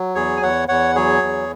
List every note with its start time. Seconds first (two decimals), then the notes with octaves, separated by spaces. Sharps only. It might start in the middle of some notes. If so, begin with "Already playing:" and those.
Already playing: F#3
0.15 E2 G#4 C#5
0.37 G#5
0.42 E2 C#5 F#5
0.68 E2 C#5 F#5
0.96 F#3 G#4 C#5
1.22 E2